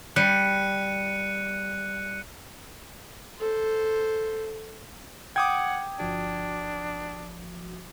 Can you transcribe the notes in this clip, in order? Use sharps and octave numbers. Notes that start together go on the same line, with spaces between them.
G3 F#6 C#7 D#7
A4 C5
F#5 G5 D6 D#6 G#6
G1 F3 D4 F#4